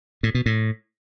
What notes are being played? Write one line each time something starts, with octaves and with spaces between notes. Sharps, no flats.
A2
B2
A2